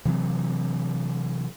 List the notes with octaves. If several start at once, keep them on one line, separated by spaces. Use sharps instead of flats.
C3 E3 F#3 C4